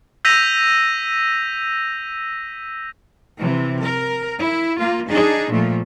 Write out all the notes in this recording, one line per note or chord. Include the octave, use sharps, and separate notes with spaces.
E6 G6 A#6 B6 D#7 F7
C3 E3
A#4
E4
A#3 F4
D4 D#4 G#4
A#2 F3 A3